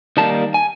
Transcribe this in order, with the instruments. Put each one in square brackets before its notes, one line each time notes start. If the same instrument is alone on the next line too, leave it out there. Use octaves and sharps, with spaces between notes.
[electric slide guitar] D#3 G3 A#3 A5
G#5